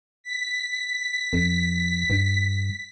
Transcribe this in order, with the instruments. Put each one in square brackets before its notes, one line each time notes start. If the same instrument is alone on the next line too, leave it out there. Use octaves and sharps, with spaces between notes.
[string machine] B6
[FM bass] F2
G2